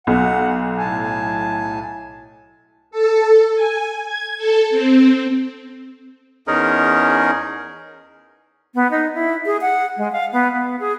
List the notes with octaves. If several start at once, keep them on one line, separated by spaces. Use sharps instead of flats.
B1 F#5
A2 G#5 A5
A4
G#5
G#6
A4
C4
E2 C#4 D#4 G#4 A#4
B3
D#4
E4
G#4
F#5
G#3
F5
B3
B3
G#4